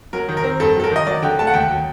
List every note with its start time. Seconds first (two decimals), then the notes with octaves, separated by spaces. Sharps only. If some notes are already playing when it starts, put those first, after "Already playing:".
0.13 F#3 A#4
0.29 D#3
0.37 A#4
0.44 C4
0.60 G2 A4
0.76 F#3 A4
0.84 A#4
0.92 D#3 D#5
1.07 F#3 D5
1.22 D3 G5
1.39 A3 A5
1.47 F#5
1.54 D#2 G5
1.69 F#3